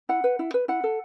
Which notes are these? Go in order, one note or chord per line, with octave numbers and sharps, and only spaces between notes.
E4 F#5
B4
E4
B4
E4 F#5
A4